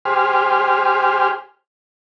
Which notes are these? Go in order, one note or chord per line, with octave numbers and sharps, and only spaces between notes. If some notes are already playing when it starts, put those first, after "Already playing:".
G4 G#4 C5 F6